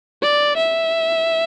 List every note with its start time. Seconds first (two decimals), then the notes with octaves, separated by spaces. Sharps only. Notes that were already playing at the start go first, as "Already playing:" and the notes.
0.22 D5
0.57 E5